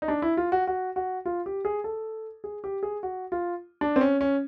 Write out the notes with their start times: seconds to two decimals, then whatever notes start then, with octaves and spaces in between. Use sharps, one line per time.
0.02 D#4
0.08 D4
0.22 E4
0.37 F4
0.52 F#4
0.67 F#4
0.96 F#4
1.26 F4
1.46 G4
1.65 G#4
1.84 A4
2.44 G#4
2.64 G4
2.83 G#4
3.03 F#4
3.32 F4
3.81 D4
3.96 C4
4.01 C#4
4.21 C#4